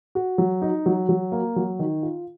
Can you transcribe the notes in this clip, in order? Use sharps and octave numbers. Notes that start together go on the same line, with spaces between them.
F#4
F#3
D#4
F#3
F#3
A#3
F#3
D#3
F4